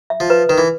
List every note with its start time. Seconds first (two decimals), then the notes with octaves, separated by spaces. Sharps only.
0.10 E5
0.20 F3
0.30 B4
0.49 D#3 B4
0.58 E3